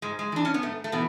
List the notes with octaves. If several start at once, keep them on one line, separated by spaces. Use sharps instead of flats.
G#2 G#3
G#3
E3 D4
C#4
B3
G#2 A3
A3
B2 E3 B3